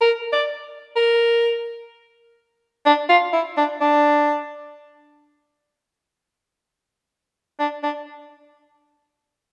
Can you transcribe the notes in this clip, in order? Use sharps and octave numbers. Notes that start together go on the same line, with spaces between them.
A#4
D5
A#4
D4
F4
E4
D4
D4
D4
D4